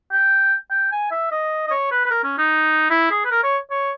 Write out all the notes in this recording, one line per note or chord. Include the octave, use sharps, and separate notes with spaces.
G5
G5
G#5
E5
D#5
D#5
C#5
B4
B4
A#4
C#4
D#4
E4
G#4
B4
A#4
C#5
C#5